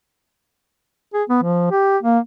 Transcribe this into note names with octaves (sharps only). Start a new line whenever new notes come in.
G#4
B3
F3
G4
A#3